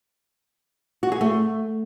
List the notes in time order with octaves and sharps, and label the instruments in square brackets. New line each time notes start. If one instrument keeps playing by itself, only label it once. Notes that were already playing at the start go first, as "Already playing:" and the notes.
[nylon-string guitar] F#4
G#4
A3